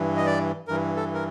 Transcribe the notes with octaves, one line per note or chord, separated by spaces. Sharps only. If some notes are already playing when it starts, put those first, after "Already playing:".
Already playing: G2 E3
D#5
D5
G2 E3 A#4
A4
A#4